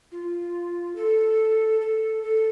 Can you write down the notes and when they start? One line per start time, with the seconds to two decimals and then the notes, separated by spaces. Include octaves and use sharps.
0.12 F4
0.96 A4
1.81 A4
2.23 A4